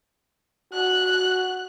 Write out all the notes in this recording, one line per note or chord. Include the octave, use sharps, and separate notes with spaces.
F#4 F#6